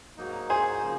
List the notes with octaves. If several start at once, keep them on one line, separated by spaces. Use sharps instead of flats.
G#2 F#3 A#3 D#4
G#4 C5
C#3 F3 A#3